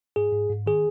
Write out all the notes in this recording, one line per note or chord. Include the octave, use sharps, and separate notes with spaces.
G#2 G#4
G#2
G#2
D#3 G#4